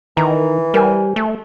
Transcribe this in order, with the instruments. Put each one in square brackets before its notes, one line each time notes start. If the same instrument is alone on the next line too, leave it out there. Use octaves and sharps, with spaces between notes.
[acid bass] D#3 [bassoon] E3 [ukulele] A#5
[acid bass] G3 [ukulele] A#4 C5 G#5
[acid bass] A3